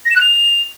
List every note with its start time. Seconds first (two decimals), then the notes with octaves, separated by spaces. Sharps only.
0.05 A#6
0.11 E7
0.16 F#6
0.21 F7